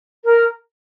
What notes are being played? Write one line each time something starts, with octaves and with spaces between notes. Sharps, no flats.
A#4